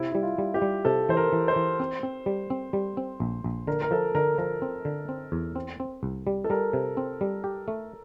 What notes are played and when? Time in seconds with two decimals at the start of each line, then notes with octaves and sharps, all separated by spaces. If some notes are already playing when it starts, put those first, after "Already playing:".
Already playing: C3 E4
0.12 G3 E4
0.22 F4
0.38 G3
0.54 G4
0.62 G3
0.85 C3 A4
1.09 E3 C5
1.17 A#4
1.32 E3
1.48 C5
1.56 E3
1.80 C4
2.03 C4
2.26 G3
2.50 C4
2.73 G3
2.97 C4
3.20 A#1
3.44 A#1
3.67 D3 A#4
3.82 A#4
3.91 F3 A4
4.15 D3 A#4
4.38 F3 A#4
4.62 C4
4.85 D3
5.09 C4
5.32 E2
5.55 C4
5.80 C4
6.03 C2
6.27 G3
6.44 A4
6.50 G3 A#4
6.73 C3
6.97 C4
7.21 G3
7.44 G4
7.68 A3